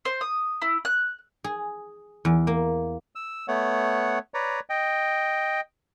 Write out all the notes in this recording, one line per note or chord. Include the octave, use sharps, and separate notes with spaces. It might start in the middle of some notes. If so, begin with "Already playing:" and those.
C5
D#6
E4
F#6
G#4
E2
A#3
E6
A3 B3 C#5 F#5
B4 C#5 D5 A#5
D#5 G5